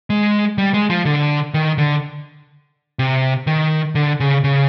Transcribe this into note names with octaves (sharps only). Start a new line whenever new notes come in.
G#3
G3
G#3
F3
D3
D#3
D3
C3
D#3
D3
C#3
C#3